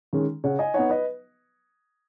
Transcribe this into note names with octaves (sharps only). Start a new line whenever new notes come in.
D#3 G#3 C#4
C#3 C#5 F#5
D#5 G#5
B3 D#4 C#5 F#5
B4 D#5